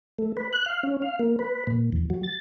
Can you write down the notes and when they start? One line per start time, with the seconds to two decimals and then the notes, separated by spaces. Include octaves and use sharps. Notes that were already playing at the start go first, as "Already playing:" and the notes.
0.19 A3
0.37 B4
0.53 F#6
0.66 F5
0.83 C#4
1.02 F5
1.19 A#3
1.39 B4
1.67 A#2
1.92 E2
2.10 F#3
2.23 A6